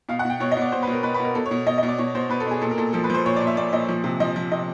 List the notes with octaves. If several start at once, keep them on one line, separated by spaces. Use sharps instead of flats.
B2 F5
F#5
B2 G5
B2 C#5
D#5
B2 D5
B2 C5
B4
B2
A#4
B2 B4
B4
B2
A#4
B2 A4
C#5
B2
B2 D#5
D#5
B2
D5
B2 C#5
B2 C5
B2 B4
A4
B2 G#4
A#2 A4
A#4
A#2 A4
F3 A4
B4
F3 C5
A#2 C#5
D5
A#2
E5
A#2 D5
A#2 D#5
F3
C3
F3 D#5
F3
C3 D#5